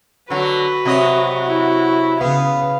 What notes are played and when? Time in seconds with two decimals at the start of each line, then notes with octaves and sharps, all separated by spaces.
0.30 D3 F#3 F#4 B4
0.85 C3 F#3 D#5
1.47 E4
2.21 C#3 B3 F5